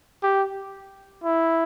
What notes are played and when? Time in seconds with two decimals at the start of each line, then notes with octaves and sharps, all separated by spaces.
0.23 G4
1.24 E4